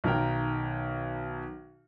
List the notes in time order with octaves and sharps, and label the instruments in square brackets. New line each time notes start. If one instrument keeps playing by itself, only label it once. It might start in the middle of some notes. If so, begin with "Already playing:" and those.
[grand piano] B1 D#3 A#4 G5